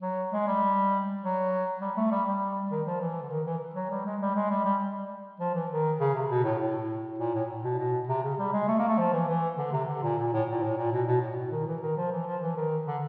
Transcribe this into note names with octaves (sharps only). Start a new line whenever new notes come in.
F#3
G#3
G3
F#3
G3
A3
G3
G3
D#3
F3
E3
D3
D#3
E3
F#3
G3
G#3
G3
G#3
G3
G3
F3
E3
D#3
C#3
C3
B2
A2
A2
A#2
A2
B2
B2
C3
C#3
G3
G#3
A3
A#3
A3
F3
E3
E3
D3
C3
D3
A#2
A#2
A2
A#2
A2
A#2
B2
B2
A2
B2
D#3
E3
D#3
F3
E3
F3
E3
D#3
D3